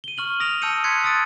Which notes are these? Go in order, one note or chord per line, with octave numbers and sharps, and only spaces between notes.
D#7 G7
C#6 F6 F#7 G7
D#6 A#6 D7 F7
A5 E6 G6 C#7 D#7
C6 F#6 G#6 B6 C#7
D#6 E6 A6 D7